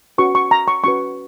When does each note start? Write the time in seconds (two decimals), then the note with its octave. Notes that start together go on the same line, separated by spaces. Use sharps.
0.18 C#4 F#4 B4 C#6
0.35 C#6
0.51 A#5
0.68 C#6
0.84 C#4 F#4 B4 C#6